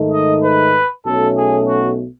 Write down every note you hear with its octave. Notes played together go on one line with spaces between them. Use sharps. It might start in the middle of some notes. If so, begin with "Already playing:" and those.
Already playing: G#2 D#3 A3 D#4
D#5
B4
B1 B2 A3 C#4 A4
G#4
F#4